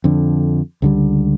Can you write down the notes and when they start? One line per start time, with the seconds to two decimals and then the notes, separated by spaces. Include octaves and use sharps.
0.04 F2 D3
0.82 C#2 D3 G3